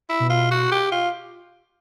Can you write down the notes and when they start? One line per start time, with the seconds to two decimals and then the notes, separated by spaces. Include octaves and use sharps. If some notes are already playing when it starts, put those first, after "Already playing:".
0.09 E4
0.20 B2
0.30 F4
0.51 F#4
0.72 G4
0.92 F4